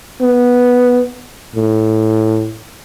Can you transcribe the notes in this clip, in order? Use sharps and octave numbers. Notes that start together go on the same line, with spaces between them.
B3
A2